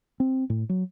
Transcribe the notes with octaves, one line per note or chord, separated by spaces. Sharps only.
C4
A2
F#3